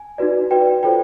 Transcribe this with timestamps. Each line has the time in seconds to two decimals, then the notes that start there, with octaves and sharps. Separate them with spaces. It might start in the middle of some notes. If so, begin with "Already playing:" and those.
Already playing: G#5
0.18 D#4 F#4 B4 D5
0.51 F#4 B4 D5 G5
0.83 F4 A4 C5 G5